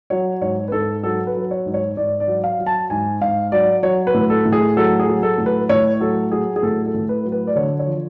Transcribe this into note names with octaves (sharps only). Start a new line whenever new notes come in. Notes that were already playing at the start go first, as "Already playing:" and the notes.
F#3 C#5
G#2 C#5
B4
G#2 A4
F#3 A4
B4
F#3
C#5
G#2
C#5
G#2 D5
D5
F#3
F5
F#3
A5
G#2 G#5
G#2 F5
F#3 D5
F#3 C#5
B4
A2
A4
A2
G#4
F#3 A4
G#4
F#3
A4
A2
B4
A2 C#5
F#3 A4
F#3 G#4
G#4
A2 A4
A4
A2
B4
F#3
B4
D5
D3 C#5
C#5
F3